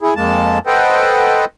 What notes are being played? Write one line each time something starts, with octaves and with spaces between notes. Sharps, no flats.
E4 G#4
F2 G#3 A#3 A5
A4 B4 C5 D#5 F#5 G5